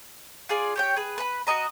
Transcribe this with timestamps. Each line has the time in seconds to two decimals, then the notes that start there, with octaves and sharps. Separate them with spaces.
0.49 F4 G#4 D5
0.76 G4 C#5 G5
0.96 G#4 B4
1.18 B4 B5
1.47 F#4 G4 D#5 A#5